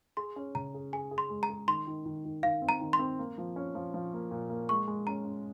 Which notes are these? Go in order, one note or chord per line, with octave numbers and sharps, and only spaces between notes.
G#4 C6
C#4
C#3 A#5
G#4
G#4 G#5
G#4
C6
G#3
A#5
G#4
D#3 C6
D#3
D#3
D#3
D#3 F5
C4
A#5
D#3
C6
C4
A#3
F3
C#4
F3
F3
A#3
A#2
A#3
G#3 C#6
G#3
C#4 A#5
C#4